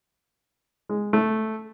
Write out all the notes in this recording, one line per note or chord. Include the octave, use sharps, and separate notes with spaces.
G#3
A3